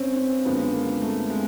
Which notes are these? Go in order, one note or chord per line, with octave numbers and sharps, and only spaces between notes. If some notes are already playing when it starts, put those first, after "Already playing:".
Already playing: G#1 G2 C4 C#4
C#4
F#1 F#2 D3 F3 G#3 B3
A#3
A3
G#3